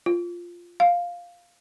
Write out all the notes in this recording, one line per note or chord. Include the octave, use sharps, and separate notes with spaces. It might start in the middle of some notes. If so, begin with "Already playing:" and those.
F4
F5